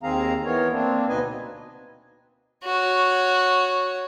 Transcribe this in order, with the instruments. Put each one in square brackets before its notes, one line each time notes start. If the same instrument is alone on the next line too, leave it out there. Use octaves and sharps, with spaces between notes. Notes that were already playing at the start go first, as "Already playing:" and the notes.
[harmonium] D#2 D#3 C4 G#4 F5 A#5
E3 B3 A#4 C#5
A#3 C4 D4
D2 B2 D#4 B4 D#5 G#5
[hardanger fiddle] F#4 C#5